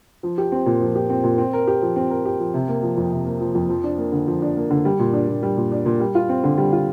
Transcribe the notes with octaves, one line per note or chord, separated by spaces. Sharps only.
F3
G4
C4
A#2
F3
G4
C4
A#2
C4
A#4
G4
F3
C4
A#4
G4
F3
C3
A#3
F3
F2
C3
A#3
F3
F2
F3
D4
A#3
D3
F3
D4
A#3
D3
G3
A#2
D4
A#2
G3
A#2
D4
A#2
G3
F4
C4
D3
G3
F4